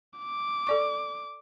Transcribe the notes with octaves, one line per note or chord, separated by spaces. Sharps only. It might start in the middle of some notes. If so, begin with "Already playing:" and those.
D6
A4 D5 C#6